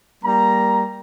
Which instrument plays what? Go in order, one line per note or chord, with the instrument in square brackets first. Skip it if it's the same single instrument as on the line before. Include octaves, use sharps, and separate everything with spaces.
[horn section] G3 A#3 A#5